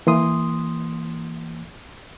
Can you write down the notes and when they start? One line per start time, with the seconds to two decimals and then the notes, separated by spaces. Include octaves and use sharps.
0.07 E3 A#3 C6 D#6